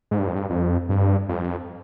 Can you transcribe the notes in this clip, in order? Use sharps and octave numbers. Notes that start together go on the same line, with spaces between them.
G#2
G2
F2
G2
F2
G2
F2